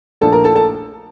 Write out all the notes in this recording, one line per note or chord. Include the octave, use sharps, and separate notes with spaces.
A#1 A#2 F3 A3 D4 A4 A5
A#4 A#5
A4 A5
A4 A5